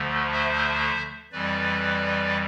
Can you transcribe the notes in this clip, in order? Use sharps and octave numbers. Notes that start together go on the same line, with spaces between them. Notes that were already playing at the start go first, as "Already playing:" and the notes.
Already playing: D2 D3 F3 A3
C5 E5
F2 E3 G3 B4 D5